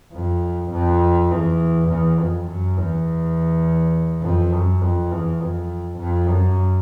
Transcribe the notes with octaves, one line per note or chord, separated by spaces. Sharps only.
F2
F2
E2
E2
F2
F#2
E2
F2
F#2
F2
E2
F2
F2
F#2